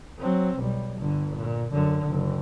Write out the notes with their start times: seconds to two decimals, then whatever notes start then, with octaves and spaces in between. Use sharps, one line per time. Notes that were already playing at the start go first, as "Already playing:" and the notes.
0.19 F#3 C4
0.58 B1 G3
0.99 G1 D3
1.34 A#2
1.71 F#2 D3
2.09 F#1